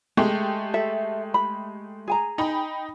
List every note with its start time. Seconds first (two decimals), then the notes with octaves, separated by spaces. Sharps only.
0.17 G#3 A3 G4 G5
0.74 A4 E5
1.34 B5
2.08 G#4 G#5 A#5
2.38 D#4 G5 B5